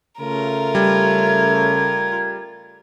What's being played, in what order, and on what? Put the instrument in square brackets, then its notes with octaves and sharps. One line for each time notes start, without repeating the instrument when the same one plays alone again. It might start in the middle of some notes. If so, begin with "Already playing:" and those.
[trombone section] C#3 A3 [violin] F4 A#4
[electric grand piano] G3 [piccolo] G#6